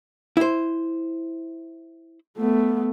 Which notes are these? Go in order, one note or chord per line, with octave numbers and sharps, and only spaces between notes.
E4 C5
A3 B3